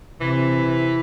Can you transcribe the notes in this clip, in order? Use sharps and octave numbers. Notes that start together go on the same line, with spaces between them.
C3 E3